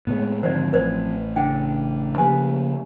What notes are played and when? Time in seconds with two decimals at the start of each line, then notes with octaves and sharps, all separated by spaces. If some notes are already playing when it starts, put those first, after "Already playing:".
0.07 A2 C3 G#3 B3 C#5
0.43 G#2 D3 D#3 F3 F#3 C4 C5 D5
0.73 A1 B4 C5 D5
1.36 C#3 D4 G5
2.18 C#3 F3 A#3 C#4 G4 B4 G#5